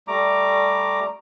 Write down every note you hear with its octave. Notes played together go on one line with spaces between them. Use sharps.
G3 A3 A#5 D6